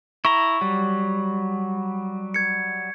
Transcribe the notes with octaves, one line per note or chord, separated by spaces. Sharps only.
E4 A#5 C#6
F#3 G3
G#6 C#7